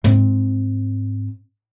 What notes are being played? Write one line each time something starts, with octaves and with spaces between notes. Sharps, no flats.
G#2 C4